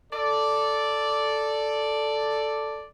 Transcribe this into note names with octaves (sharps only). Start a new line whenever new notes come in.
A4 D5